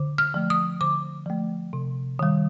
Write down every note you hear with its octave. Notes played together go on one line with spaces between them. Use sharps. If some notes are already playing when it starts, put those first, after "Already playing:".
Already playing: D3
F6
F3 A3
D#6
D3 D6
F3 A3
C3
D#3 G3